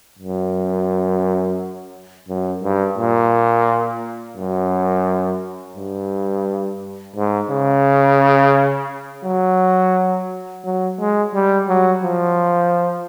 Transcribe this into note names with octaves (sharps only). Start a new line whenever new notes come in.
F#2
F#2
G2
A#2
F#2
G2
G#2
C#3
F#3
F#3
G#3
G3
F#3
F3